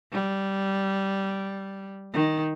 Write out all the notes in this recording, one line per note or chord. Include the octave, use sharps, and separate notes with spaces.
G3
D#3